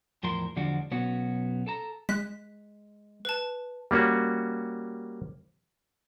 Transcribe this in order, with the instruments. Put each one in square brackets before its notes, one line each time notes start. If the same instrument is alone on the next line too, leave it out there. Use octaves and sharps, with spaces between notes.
[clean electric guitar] E2 A2 F3 A#4 C6
E2 D3 F3 G#3 D4 F#4
B1 B3 C#4 F#4
A4 A5 A#5
[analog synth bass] G#3 [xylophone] F#6 B6
[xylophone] B4 A5
[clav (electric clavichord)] G3 A#3 C#4 F#4